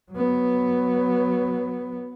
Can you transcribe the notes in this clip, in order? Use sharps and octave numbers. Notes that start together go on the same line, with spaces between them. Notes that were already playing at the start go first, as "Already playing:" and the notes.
F#3 B3